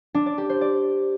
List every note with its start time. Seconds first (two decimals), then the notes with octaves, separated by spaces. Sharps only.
0.15 D4
0.26 D5
0.38 G4
0.50 C5
0.61 D5